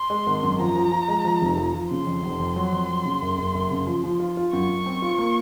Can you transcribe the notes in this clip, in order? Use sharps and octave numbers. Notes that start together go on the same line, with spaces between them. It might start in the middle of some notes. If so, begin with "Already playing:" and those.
Already playing: C6
G#3
G#1
F#2
F3 A#5
F3
F3
G#3
F3
F1
F3
F3
C#3 C6
F2
F1
F2
F#3
F2
F#3
C#3
F#1
F#1
F#1
C#3
F3
F3
F4
F4
F#2 C#6
F#2
C4
F4
A#3